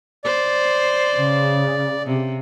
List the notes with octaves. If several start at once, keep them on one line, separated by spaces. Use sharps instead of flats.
C5 D5
C#3
C3